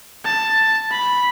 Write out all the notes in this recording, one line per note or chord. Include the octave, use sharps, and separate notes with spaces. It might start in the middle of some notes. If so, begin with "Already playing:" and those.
A5
B5